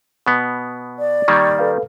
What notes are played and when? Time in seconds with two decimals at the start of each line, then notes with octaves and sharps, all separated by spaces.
0.26 B2 B3
0.99 D5
1.28 D#3 G3 A#3 C#6 G#6 A6
1.59 A4 B4 F5